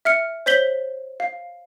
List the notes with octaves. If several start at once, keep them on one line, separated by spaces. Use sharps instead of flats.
E5 F6 C#7
C5 C#5 G6 B6 F#7 G7
F5